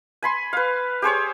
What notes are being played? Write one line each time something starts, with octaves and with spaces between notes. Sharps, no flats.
G#5 B5 C6
B4 F5
G4 G#4 C5 C#5